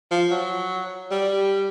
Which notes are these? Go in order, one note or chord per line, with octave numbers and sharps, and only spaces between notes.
F3
F#3
G3